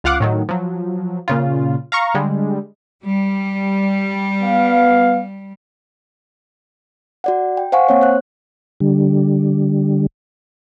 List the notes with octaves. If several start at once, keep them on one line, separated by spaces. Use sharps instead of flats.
C#2 F4 F5 F#5 D6
A2 D#3 F#3
F3 F#3
A#2 C#3 F4
F5 A#5 C#6
D3 G3 G#3
G3
B3 F5
F#4 D5 F#5
G5
C5 F5 F#5 G#5 C#6
A#3 C4 C#5
C5 F#6
D3 G3